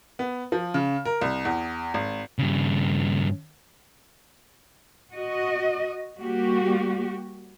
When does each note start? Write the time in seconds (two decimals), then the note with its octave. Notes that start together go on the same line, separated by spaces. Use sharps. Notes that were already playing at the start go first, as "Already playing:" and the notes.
0.19 B3
0.52 F3
0.74 C#3
1.05 A#4
1.21 C2
1.45 E2
1.94 G#1
2.39 G2 C#3
5.13 F#4 D#5
6.18 G3 A#3 F#4 G4